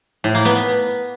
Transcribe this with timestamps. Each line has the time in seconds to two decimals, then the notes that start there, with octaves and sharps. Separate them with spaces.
0.24 A2
0.35 A#3
0.45 B3